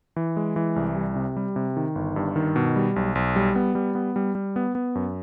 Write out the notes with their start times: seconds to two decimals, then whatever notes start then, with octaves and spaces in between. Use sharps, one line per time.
0.16 E3
0.37 G#3
0.56 E3
0.76 C2
0.96 G3
1.16 C3
1.37 G3
1.56 C3
1.77 D#3
1.95 G1
2.16 G2
2.36 D#3
2.56 B2
2.76 G3
2.96 B1
3.15 B1
3.36 G3
3.56 B3
3.75 G3
3.95 B3
4.16 G3
4.35 G3
4.56 B3
4.75 B3
4.95 F#2